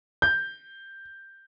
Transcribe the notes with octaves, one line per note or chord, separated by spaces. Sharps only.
G6